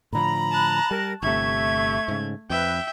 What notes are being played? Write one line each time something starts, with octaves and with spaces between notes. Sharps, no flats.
A2 D3 F3 A#5 B5
A5 F#6
G3 A#4
G1 C3 A3 E5 C#6 G#6
G#2 C#3
F2 B4 E5 G5